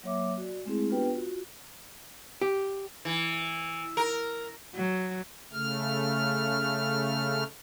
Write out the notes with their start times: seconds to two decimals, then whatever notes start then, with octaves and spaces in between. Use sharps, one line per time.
0.03 F#3 A#3 C#5 E5 D6
0.37 F#4 D5
0.65 G#3 A3 C4 E4 G#4
0.89 B3 D4 F4 G4 B4 G5
1.11 F4 F#4
2.41 G4
3.05 E3
3.97 A#4
4.75 F#3
5.52 C#3 A3 F6